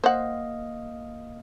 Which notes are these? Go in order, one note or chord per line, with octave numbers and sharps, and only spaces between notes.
A#3 C5 D#5 F5 F#5